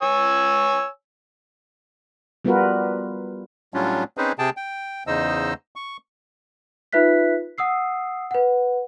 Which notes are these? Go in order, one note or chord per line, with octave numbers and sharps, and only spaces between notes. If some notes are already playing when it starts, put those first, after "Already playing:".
C#5 G#5 E6
G3 B3 F4 F#4 A#4 B4
A2 F#3 G3 C#4 D4 F4
C4 C#4 D#4 G#4 B4 C5
C3 G#4 G5 A5
G5
E2 C#3 D#4 C5 D#5 E6
C#6
D#4 F4 B4 E5 F#6 B6
F#5 D#6 E6 C7
B4 F#5